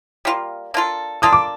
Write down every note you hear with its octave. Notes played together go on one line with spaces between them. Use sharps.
G3 A#3 F4
A#3 D4 F4 A4
A#3 D4 F4 A4 D#6
D6